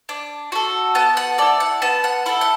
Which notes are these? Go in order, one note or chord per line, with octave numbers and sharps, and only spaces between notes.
D4
F#4 A4
B3 A5
F#5
E4 A4 D5
F#5
B3 A5
F#5
E4 A4 F#5
F#5